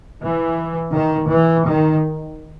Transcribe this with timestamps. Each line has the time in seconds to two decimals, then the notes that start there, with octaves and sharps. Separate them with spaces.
0.22 E3
0.94 D#3
1.31 E3
1.68 D#3